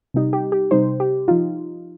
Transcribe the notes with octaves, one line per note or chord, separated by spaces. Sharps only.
C3 G3 D#4
G4
G4
C3 G3 D#4 C5
G4
F3 D#4 F4